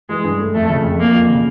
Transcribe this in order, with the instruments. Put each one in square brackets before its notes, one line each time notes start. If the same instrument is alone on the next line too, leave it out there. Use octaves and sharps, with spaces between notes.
[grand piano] E3 [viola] G#3
[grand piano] G2
A3
[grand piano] F2 [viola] A3
[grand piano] C#3
F2
[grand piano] F3 [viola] A#3
[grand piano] F2
C#3